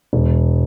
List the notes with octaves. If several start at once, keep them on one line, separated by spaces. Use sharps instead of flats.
E1